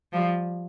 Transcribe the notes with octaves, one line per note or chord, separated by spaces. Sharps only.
F3 G3